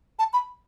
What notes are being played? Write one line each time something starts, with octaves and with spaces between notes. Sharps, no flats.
A5
B5